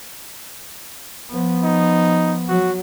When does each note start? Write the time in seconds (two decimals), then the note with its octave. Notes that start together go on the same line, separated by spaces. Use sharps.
1.31 F3 B3
1.63 D#4
2.48 F#3 F#4